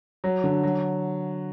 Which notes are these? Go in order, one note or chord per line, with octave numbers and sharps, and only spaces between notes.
F#3
D3
F#3